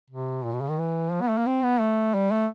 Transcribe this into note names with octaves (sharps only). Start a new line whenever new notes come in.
C3
A#2
B2
C#3
D#3
E3
F3
B3
A3
A#3
C4
B3
A3
G3
A3